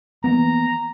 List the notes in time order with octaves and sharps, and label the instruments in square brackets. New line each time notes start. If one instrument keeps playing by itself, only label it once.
[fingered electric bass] E3 A#3 B3 [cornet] A#5